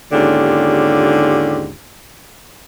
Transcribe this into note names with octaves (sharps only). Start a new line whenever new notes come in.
D#2 G#2 D3 C#4 F4 G4